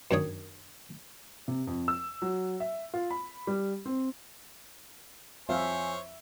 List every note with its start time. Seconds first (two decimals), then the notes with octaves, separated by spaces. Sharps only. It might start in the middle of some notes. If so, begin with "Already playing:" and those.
0.11 F#2 D#3 D4 C#5 D#6
1.48 C3
1.67 F2
1.88 E6
2.22 F#3
2.60 E5
2.94 F4
3.11 B5
3.47 G3
3.86 C4
5.49 F2 C4 C5 C#5 E5 F5 G#5